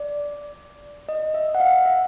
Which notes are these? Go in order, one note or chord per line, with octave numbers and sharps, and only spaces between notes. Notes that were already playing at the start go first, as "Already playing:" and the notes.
Already playing: D5
D#5
E5
F#5
F5
E5